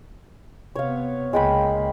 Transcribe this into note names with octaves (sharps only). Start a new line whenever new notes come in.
C3 B3 C#5 F5
C#2 G#3 A#3 G5 B5